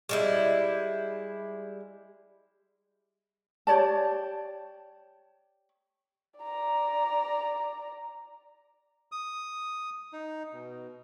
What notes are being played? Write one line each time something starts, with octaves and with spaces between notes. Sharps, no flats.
G3 G#3 E4
G4 C#5 D5 A5
D5 A#5
D#6
D#4
B2